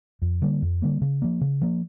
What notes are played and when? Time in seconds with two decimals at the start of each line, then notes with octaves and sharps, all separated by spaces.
0.22 F2
0.42 D3 G3 A#3
0.62 F2
0.82 D3 G3 A#3
1.02 C#3
1.22 F3 A#3
1.41 C#3
1.61 F3 A#3